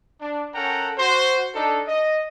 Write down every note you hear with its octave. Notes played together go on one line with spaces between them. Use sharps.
D4
C#4 A4 A#4 F#5 G5 A#5
F#4 C5
D4 D#4 A4
D#5